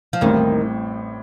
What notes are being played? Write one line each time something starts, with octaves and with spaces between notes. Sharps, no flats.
F3
A1 D#2 A2 D#3 G3 C4